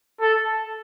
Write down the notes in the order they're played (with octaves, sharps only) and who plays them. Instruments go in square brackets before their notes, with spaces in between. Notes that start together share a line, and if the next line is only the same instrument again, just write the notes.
[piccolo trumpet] A4